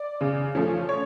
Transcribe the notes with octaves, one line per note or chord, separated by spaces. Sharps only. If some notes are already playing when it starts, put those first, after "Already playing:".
Already playing: D5
C#3
F3 A3 C#4
C#5